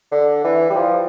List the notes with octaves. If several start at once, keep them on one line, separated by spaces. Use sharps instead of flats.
D3
E3
G3
F3